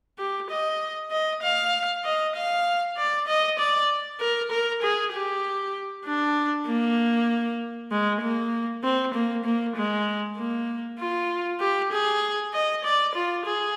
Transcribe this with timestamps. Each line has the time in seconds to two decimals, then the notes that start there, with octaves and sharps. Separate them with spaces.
0.19 G4
0.50 D#5
1.11 D#5
1.42 F5
2.05 D#5
2.35 F5
2.97 D5
3.27 D#5
3.59 D5
4.20 A#4
4.51 A#4
4.82 G#4
5.12 G4
6.05 D4
6.67 A#3
7.91 G#3
8.21 A#3
8.83 C4
9.14 A#3
9.45 A#3
9.76 G#3
10.37 A#3
10.99 F4
11.60 G4
11.92 G#4
12.53 D#5
12.84 D5
13.15 F4
13.45 G#4